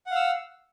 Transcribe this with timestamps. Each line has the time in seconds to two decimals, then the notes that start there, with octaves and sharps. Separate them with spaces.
0.06 F#5
0.11 F5
0.16 E6